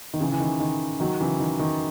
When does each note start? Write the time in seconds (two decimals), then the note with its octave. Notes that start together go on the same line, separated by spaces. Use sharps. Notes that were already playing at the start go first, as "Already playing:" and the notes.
0.14 D#3
0.20 C#3 E3
0.32 E3
0.40 D#3
0.60 D#3
1.00 D#3 F#3
1.20 C#3 E3
1.40 D#3
1.59 D#3